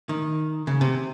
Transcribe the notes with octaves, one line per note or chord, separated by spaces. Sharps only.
D#3
C#3
C3